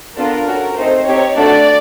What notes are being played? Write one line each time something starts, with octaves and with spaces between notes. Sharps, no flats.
B3 D4 F4 A4 A#4
C#4 F#4 A4
A3 C4 D#4 C5
C4 D#4 G4 C#5
A3 D4 F#4 A4 D5